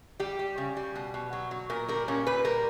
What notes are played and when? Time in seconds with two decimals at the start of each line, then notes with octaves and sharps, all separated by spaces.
0.20 G3 G4
0.39 G3
0.58 C#3
0.77 G3
0.95 B2
1.14 B2
1.33 F#3
1.51 F#3
1.70 A#2 A#4
1.88 G3 A#4
2.08 A#2 C#4
2.26 A#2 B4
2.45 G3 A#4